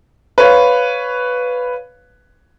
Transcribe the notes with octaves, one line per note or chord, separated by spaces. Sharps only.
B4 C#5 F5